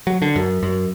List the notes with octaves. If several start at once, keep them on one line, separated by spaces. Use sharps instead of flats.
F#3
D3
F#2
F#2